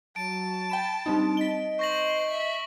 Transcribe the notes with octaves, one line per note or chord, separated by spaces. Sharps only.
F#3 A5 D7
G5 B5 E7
G3 C4 D4 D#4
D#5 B6 G7
C5 C#6 A#6 F#7
E5